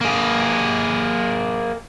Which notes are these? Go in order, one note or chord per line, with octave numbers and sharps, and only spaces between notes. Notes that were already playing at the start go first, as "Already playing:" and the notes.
A#3 G#4